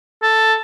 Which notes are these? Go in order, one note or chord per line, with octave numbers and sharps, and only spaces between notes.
A4